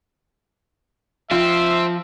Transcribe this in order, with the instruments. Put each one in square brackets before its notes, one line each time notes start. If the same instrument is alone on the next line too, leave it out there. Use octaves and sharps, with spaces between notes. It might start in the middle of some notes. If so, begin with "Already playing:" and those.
[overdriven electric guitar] F3 [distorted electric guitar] C4 [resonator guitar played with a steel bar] F4 [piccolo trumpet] E5